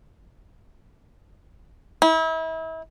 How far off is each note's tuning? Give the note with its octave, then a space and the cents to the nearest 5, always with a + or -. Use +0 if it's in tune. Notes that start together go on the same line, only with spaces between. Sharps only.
E4 -35